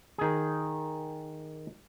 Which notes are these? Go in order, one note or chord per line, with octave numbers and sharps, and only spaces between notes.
D#3 G#4